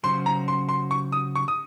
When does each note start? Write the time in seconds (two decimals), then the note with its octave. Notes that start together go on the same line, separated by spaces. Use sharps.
0.03 C#3 F#3 C#4 F#4 C5 C6
0.26 A#5
0.48 C6
0.69 C6
0.91 C#6
1.12 D#6
1.35 C#6
1.48 D#6